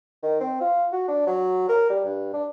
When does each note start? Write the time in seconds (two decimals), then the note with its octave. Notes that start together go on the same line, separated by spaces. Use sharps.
0.23 D#3
0.40 C4
0.61 F4
0.92 F#4
1.08 D4
1.26 F#3
1.69 A#4
1.90 G3
2.05 G2
2.33 D4